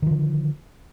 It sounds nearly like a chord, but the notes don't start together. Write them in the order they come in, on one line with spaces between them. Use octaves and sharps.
D#3 F3 D3